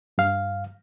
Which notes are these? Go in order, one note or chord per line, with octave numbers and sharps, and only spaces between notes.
G2 F5